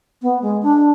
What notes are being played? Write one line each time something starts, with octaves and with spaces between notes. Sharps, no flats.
B3
G#3
D4